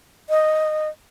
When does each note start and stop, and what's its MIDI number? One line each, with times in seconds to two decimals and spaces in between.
0.30 0.89 75